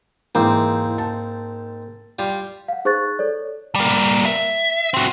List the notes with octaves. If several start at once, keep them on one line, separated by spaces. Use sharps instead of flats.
G#2 E3 G#3 A#3 C4
A5
G3 F4
F5 F#5
D#4 G#4 C5 C#6 F#6 A6
A4 C#5 D5
G3 A#3
E5
C4 F#4